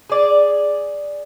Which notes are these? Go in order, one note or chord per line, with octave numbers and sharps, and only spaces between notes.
G#4 D5